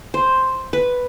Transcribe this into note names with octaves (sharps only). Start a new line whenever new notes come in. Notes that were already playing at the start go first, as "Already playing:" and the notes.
C5
B4